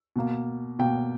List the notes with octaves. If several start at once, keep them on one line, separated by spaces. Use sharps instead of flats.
B2 A#3
B2 A#3 G5